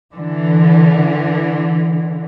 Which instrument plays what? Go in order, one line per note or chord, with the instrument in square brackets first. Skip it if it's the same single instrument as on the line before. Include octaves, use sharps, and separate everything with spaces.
[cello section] D3 E3